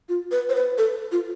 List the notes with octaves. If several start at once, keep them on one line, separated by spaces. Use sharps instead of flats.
F4
B4
C5
B4
A4
F4